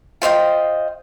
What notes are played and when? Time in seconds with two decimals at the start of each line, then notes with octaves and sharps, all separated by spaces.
0.22 F4 C5 D#5 G5